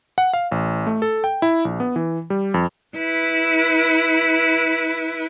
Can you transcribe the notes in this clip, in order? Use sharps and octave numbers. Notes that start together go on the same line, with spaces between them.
F#5
F5
A1
A3
A4
G5
E4
A#1
B3
E3
G3
F2
E4 B4